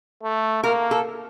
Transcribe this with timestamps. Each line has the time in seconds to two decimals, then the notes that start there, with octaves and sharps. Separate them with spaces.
0.23 A3
0.63 A#3 A#4
0.91 A4